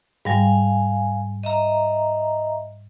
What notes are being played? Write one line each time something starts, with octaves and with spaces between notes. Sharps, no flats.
G#2 G3 F5 G#5
D#5 E5 A#5